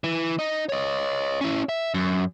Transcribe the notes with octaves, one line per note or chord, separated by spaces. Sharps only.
E3
D#4
C#5 D#5
C#4 E4
E5
F#2